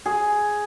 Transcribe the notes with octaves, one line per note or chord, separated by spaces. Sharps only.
G#4